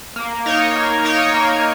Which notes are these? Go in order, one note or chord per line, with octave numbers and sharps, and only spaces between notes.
A#3
D#4 A#4 C#5
A#3
D#4 A#4 C#5
A#3